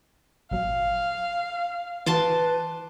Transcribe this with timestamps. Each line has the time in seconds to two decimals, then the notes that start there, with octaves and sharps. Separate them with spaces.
0.51 G#1 A#2 F#3 F5
2.06 E3 F#4 B4 A5 C6 D6